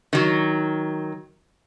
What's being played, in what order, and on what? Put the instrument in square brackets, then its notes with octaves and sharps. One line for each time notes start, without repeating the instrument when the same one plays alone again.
[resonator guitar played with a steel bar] D#3 F#3